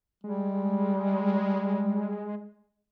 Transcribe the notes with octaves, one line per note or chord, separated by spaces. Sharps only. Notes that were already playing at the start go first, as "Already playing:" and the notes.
G3 G#3